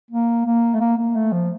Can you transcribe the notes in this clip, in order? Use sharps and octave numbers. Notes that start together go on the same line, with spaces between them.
A#3
A#3
A3
A#3
A#3
A3
F3